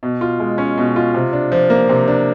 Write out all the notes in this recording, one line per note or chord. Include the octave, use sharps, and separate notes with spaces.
B2
F4
G#3
C#4
B2
F4
C3
D4
F3
A#3
C3
D4